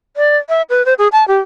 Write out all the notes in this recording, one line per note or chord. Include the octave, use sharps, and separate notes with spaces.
D5
E5
B4
C5
G#4
A5
G4